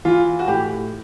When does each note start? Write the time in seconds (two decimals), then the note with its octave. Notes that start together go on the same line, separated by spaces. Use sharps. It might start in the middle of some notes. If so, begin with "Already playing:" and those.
0.05 E3 F4
0.39 F#4
0.48 A2 G4